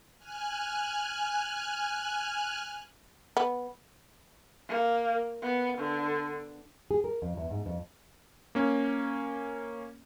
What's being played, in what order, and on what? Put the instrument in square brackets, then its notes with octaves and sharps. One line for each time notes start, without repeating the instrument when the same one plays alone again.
[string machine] G#5 F6 F#6
[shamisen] B3
[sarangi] A#3
B3
D3
[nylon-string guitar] G#4
A#4
F2
E2
G#2
F2
[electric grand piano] A#3 C#4